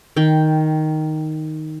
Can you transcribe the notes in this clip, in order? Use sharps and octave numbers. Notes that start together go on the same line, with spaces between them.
D#3 G5